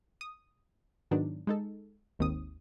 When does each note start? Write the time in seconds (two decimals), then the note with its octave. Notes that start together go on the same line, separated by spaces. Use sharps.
0.21 D#6
1.11 G#2 D#3 F#3 B3 D4 D#4
1.47 G#3 D#4 A4
2.19 G#1 D#2 C4 D#6